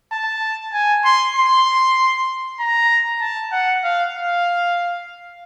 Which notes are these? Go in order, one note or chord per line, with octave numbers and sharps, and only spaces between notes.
A5
G#5
C6
C6
A#5
A5
F#5
F5
F5